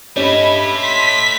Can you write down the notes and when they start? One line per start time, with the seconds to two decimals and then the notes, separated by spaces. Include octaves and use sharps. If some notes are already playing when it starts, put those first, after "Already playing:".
0.17 G2 A3 C#4 E4 G4 D#5 B5
0.78 C6 B6